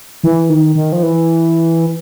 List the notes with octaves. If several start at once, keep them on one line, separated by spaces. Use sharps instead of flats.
E3
D#3
D#3
F3
E3